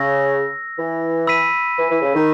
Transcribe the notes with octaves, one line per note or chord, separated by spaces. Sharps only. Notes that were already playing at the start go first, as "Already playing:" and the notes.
Already playing: C#3 E6 A#6
E3
B5 E6 B6 D#7
E3
E3
C#3
D#3